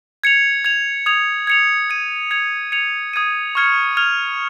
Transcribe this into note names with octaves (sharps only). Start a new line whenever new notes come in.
G#6 C#7 F7
G#6 F7
D#6 G#6 F7
G#6 C#7 F7
G#6 D#7
G#6 C#7 F7
G#6 C#7 F7
D#6 G#6 D#7
C#6 F6 G#6 C#7
F6 G#6 F7